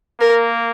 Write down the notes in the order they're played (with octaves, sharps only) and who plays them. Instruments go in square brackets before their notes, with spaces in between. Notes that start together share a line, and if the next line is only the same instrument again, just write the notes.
[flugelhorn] A#3 [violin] A#4